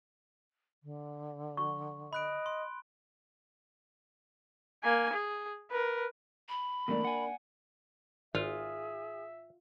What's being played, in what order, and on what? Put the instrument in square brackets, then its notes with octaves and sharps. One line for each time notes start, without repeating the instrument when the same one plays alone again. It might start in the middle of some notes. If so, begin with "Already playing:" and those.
[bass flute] D3
[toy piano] C#6
[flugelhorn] D#5 [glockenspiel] B5 F#6 D7
[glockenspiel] C6
[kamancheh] A#3 G#5
G#4
A#4 B4
[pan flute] B5
[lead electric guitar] E2 A3 [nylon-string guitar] A#3 D4
[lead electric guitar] F#5 G#5
[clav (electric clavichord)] G#1 [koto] F4 [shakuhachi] G#4 [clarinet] E5